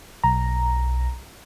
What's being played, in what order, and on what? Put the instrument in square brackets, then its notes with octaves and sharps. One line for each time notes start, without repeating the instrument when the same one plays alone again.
[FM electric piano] B1 A#5